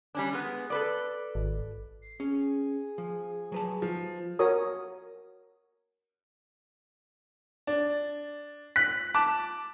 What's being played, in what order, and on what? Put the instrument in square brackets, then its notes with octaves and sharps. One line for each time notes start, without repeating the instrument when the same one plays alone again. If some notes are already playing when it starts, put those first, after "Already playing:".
[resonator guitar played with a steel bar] G3 C#4 D4
G#3 B3
A4 B4 D5
[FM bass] G#1
[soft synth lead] C7
[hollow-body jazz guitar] C#4 [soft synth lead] G#4
[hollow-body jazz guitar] F3
F#3 B4 A5
[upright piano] F3
[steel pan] F#4 A#4 C#5 D#6
[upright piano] D4
F#6 B6
A5 D6 F#6